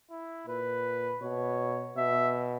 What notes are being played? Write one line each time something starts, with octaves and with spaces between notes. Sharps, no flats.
E4
A#2 B4
B2 C#5
B2 E5